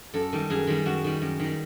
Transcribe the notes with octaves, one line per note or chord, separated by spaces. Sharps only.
F#2 A4
D#3 G3
F#2 G#4
D#3 G3
F#2 F#4
D#3 G3
F#2
D#3 G3